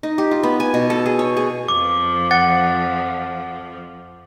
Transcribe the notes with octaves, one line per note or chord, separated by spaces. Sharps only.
D#4
G4
F4
B3
G#5
B2
A4
G#4
C#5
G#4
F2 F3 D6
F#5 A6